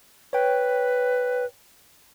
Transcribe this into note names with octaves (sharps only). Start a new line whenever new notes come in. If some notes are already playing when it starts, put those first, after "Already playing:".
B4 C#5 G5